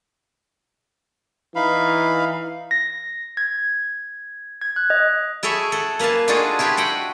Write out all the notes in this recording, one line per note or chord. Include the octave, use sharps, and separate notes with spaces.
E3 D#4 F5 B5
A#6
G#6
G#6
F#6
D#5
E4 G#4 A4 C#5 E5
A4 F#5
A#3 B4 F5 G#5 A5
D4 D#4 F4 F#4 G#4 A4
E4 F4 G4 B4 G#5
F#4 F#5 G5